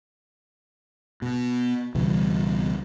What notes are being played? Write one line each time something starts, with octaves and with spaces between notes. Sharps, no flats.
B2
C#2 B2 E3 G3